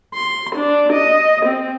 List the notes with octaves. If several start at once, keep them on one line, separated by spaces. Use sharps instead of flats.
C6
D4
D#5
C4